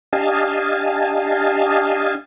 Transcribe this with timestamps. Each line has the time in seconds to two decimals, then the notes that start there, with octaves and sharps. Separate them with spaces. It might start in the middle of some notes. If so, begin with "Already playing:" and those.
0.13 D4 G4 D#5 F5 G#5 A5